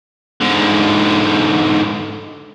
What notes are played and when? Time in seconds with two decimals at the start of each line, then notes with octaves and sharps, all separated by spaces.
0.41 G#2 D3